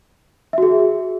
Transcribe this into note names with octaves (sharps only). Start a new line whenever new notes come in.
F#4 G#4 E5